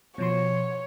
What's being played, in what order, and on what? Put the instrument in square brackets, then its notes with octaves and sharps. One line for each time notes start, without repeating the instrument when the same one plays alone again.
[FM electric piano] B2 F3 C6 [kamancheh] C#5